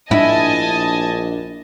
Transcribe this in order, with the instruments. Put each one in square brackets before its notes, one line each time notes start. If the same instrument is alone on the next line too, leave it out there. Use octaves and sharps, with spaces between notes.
[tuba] A#1 [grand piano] D4 A#6 [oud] E4 [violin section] D#5 G#5 A5